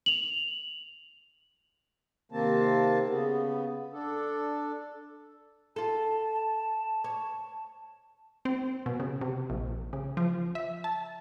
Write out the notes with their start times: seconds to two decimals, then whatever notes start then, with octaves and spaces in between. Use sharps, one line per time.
0.06 F7 F#7
2.32 C3 D#3 A#3 C4 A5
3.07 C#3 B3
3.93 D4 A4
5.76 F4 A4 A5
7.04 C#5
8.45 C4
8.86 B2
9.00 C#3
9.21 C3
9.50 A#1
9.93 C#3
10.17 F3
10.55 E5
10.84 A5